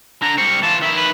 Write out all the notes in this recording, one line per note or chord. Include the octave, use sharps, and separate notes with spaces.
D3 A#5
G3 C4 C#6
E3 F4 A5
D#3 E4 E5
B4